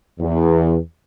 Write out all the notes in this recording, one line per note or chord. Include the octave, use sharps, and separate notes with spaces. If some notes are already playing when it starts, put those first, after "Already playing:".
E2